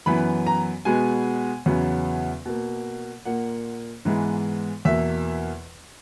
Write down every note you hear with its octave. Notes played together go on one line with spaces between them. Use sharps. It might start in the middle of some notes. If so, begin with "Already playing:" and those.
F#2 E3 B3 B5
A#5
B2 G#3 B3 G#5
E2 C#3 F#3 B3
B2 A#3
A#2 A#3 F#5
G#2 E3 G#3 B3
E2 B2 A#3 E5